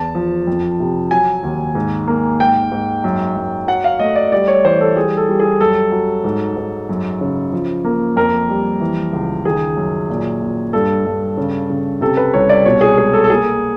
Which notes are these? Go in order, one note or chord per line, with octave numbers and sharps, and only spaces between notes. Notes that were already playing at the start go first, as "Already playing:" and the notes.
Already playing: E2 A5
F3
F2
C3
F#3 G#5
D#2
G#2
A#3
G#2 G5
G#2
F#2
F#2
F#3 F#5
F5
A3 D#5
D5
G3 D5
C#5
E3 C5
A4
G3 G#4
A4
G3
G#4
F#2 A4
F#3
G#2
G#2
F#2
C#3
F3
A#3
F2 A#4
G3
E3
C#2
D#3 G#4
F#2
A#2
A#2
G2 A4
G2
C#3
C#3
C3 A4
B4
C2 C#5
D5
B2 C#5
G#4
G#3 G#4
A4
A4
A#3 G#4